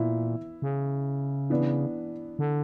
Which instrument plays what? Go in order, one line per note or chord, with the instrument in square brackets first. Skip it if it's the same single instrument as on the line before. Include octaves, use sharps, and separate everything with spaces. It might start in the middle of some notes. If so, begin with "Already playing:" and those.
Already playing: [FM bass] A#2 [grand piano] E3 B3 E4
[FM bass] C#3
[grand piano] E3 B3 D4
[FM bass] D3